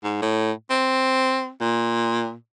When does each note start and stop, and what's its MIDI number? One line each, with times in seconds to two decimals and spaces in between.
0.04 0.18 44
0.22 0.52 45
0.70 1.51 60
1.61 2.34 46